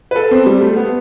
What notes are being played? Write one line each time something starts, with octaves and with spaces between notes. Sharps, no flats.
B4
A4
C4
G3
A3
B3